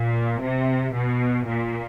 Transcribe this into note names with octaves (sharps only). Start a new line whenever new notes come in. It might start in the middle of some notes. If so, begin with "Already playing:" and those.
Already playing: A#2
C3
B2
A#2